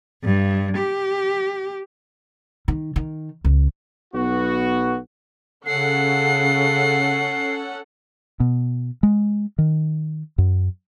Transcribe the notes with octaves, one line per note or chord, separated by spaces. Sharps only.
G2
G4
D#3
D#3
C#2
B1 B3 F#4
C#3 C#4 A4 F#5 C7
B2
G#3
D#3
F#2